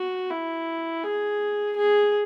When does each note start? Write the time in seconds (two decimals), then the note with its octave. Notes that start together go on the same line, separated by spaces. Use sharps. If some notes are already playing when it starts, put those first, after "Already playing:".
Already playing: F#4
0.30 E4
1.04 G#4
1.76 G#4